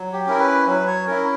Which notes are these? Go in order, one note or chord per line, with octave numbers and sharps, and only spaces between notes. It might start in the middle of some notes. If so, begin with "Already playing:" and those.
Already playing: F#3
G4
C#4 E4 A#4
B4
F#3 B4
C#5
C#4 E4 A#4